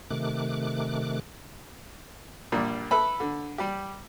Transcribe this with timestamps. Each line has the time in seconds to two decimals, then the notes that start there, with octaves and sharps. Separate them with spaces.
0.10 C3 D#3 A3 D6 F#6
2.52 A#1 A#2 G3
2.91 A4 B4 E5 B5
3.20 D3
3.58 G3 G4